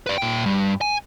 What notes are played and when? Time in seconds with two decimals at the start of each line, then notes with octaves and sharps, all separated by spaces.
0.06 B4 D5
0.18 A#2 G5
0.46 G2
0.81 G#5